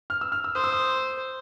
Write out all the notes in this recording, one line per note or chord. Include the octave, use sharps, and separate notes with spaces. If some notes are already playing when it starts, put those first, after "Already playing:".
F6
E6
F6
E6
C5 D#6
E6
D#6